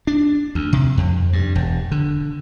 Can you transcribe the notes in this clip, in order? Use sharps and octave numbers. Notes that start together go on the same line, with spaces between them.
D4
D2
C3
F2
G2
E1
D3